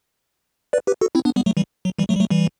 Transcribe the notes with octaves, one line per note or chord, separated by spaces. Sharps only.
B4 D5
G4 B4
F#4 A4
C4 E4
B3 D4
G3 B3
F#3 A3
E3 G3
F#3
E3 G3
F#3 A3
G3
F#3 A3
E3 G3